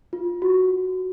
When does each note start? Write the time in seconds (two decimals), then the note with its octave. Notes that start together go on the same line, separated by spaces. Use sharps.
0.13 F4
0.42 F#4